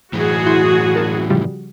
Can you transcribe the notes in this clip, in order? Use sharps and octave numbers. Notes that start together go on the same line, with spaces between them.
A2 E3 F#3 F#4 G#4
E4 C6 G6
A#4 A5
C#3 F3 G3